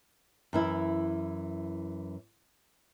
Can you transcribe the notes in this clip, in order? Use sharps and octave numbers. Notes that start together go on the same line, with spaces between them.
F#2 E3 E4